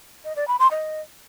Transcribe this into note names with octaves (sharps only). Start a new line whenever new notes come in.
D#5
D5
B5
C6
D#5